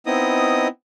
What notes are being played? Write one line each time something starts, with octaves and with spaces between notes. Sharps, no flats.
B3 C4 D#4 E4 D#5 D#6